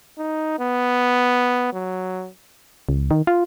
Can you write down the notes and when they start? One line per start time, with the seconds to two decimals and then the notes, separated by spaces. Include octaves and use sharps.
0.18 D#4
0.60 B3
1.73 F#3
2.89 C#2
3.11 D#3
3.27 F4